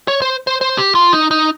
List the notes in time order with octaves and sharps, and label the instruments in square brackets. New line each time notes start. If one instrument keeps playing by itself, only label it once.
[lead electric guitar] C#5
C5
C5
C5
G4
F4
D#4
D#4